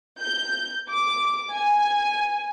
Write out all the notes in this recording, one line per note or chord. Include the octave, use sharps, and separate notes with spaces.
G6
D6
G#5